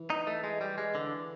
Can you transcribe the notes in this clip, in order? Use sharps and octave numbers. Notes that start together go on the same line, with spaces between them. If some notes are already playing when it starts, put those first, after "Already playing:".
Already playing: E3
D#4
A3
G#3
G3
G#3
D3